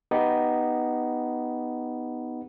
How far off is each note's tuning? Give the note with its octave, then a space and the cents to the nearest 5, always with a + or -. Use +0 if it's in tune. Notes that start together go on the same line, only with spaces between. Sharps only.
B3 +0 D#4 +0 G4 +0